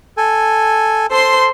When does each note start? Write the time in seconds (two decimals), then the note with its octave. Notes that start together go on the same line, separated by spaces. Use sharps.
0.17 A4 G#5
1.11 A4 C5 C6